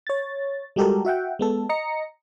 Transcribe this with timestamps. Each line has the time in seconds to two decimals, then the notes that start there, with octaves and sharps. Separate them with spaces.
0.07 C#5 A6
0.76 G3 G#3 F#4 G4 A4 A#4
1.05 F#4 E5 F#5 G5
1.39 G#3 B3 A4
1.69 D#5 A#5 A#6 C#7